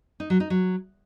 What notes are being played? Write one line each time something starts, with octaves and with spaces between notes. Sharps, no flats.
D#4
F#3
D#4
F#3